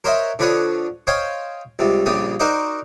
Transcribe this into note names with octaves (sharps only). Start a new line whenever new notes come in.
A#4 C5 C#5 D#5 E5 F#5
D3 F3 B4 C#5 F#5 D#6
C5 C#5 D#5 F5 G5 G#5
C#2 C3 G3
A#1 C#3 G3 G4 D#6
D#4 F#4 A#4 C5 D5 D#5